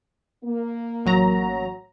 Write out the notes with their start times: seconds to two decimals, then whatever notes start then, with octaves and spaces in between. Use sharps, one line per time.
0.44 A#3
1.06 A1 F#3 A#5